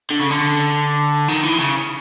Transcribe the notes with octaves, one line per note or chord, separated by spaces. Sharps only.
D3
C#3
D3
D#3
E3
C#3